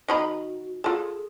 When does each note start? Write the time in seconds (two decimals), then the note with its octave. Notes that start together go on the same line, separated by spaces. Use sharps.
0.08 D#3 D#4 F#4 B5
0.84 F4 G#4 A4